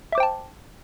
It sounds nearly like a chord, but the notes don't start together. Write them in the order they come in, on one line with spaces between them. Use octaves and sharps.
E5 D6 C5 G5 A5